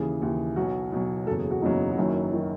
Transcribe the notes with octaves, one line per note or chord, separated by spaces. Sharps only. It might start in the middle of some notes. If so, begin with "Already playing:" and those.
Already playing: D#2 C#3 E3 G#4
D#2 C#3 E3
B1 B2 F#3 F#4
B1 B2 F#3
F#1 E2 C#3 F#3 A4
G#4
F#4
F#1 E2 C#3 F#3 D#4
F#4
F#1 F#2 D#3 F#3 E4
D#3 F#3